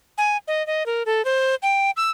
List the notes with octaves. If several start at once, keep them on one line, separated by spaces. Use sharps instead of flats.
G#5
D#5
D#5
A#4
A4
C5
G5
E6